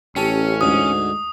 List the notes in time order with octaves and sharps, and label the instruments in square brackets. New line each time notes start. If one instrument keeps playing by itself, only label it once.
[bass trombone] A1 [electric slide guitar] C#4 [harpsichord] G4 A4
[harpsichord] D2 G#2 [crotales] D#6